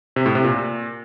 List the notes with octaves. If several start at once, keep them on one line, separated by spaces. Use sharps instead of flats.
C3
A2
C3
A#2